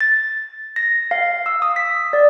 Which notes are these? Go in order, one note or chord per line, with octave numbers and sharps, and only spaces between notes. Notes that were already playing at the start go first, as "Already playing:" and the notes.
A6
A#6
F5
E6
D#6
B6
D5